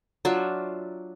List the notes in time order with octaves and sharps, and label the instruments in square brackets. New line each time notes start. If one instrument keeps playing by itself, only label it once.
[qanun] F#3 D4 F4 E5